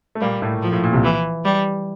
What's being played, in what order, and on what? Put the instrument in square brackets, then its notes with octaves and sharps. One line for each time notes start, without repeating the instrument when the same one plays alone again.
[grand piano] A3
[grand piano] A#2 A#3 [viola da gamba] G3
[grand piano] A2 A3
[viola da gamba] F3
[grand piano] A2
A#2
C2 C3
[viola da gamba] E3
G3